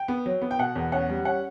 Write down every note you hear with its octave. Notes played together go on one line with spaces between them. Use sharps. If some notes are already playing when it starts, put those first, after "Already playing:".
Already playing: G5
B3
F#3
B3
G5
B2 F#5
E2
C#4 F#5
G3
C#4 F#5